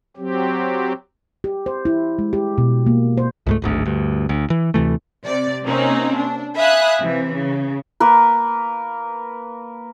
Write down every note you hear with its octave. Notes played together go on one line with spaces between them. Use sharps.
F#3 C4 G4
G4
C5
E4
G#3
G4
B2
A#3
C5
C#2 G#2 A3
D1 G#1 D2
D2 G2
D2
E3
D2 C3 E3 A3
C3 D5
C3 A#3 C4 C#4 D#4
D4
E5 F5 G#5 B5 D#6 F#6
C3 E3
C#3
A#3 A#4 B4